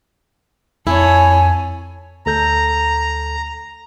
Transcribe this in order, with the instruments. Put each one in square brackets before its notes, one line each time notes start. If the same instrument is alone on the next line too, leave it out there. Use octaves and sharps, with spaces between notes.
[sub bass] F2 [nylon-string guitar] E4 [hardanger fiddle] A4 C#5 [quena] G#5
[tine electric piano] D2 A4 G6 [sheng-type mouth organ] A#5